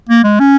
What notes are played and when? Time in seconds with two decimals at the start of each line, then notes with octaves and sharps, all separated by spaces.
0.09 A#3
0.24 G#3
0.40 C#4